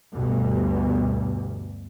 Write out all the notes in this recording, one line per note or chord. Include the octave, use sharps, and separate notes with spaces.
G1 D2 G2 B2